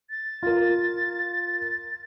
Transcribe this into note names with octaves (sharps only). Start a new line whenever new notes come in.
A6
F4 A#4